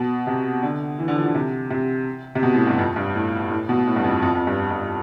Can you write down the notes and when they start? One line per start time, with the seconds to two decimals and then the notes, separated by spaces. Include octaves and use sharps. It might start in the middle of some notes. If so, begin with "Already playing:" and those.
Already playing: B2
0.27 C3
0.62 D3
0.99 E3
1.08 D3
1.16 F3
1.26 D3
1.35 C3
1.70 C3
2.35 C3
2.43 B2
2.54 A2
2.67 G2
2.79 F2
2.96 G2
3.15 A2
3.51 A2
3.69 B2
3.87 A2
3.96 G2
4.04 F2
4.22 F2
4.35 F2
4.47 G2
4.71 G2